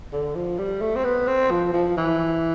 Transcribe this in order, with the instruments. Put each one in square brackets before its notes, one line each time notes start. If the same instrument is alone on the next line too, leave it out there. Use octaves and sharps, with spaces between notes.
[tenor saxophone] D3
F3
G3
A3
C4
B3
C4
F3
F3
E3